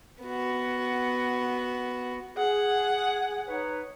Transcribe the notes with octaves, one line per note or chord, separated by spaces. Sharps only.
B3 F#4
G#4 F#5
D#4 B4 C#5